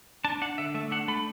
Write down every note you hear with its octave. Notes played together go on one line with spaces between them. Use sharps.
D4 A5
D4 F#5
D3 E5
A3 E5
D4 F#5
A3 B5